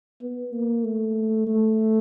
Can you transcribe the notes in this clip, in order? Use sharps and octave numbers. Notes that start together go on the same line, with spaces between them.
B3
A#3
A3
A3